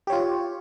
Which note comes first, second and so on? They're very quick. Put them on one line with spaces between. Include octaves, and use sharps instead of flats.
G4 C#5 F4